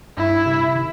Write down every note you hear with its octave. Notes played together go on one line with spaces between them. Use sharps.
G2 E4
C3
D#3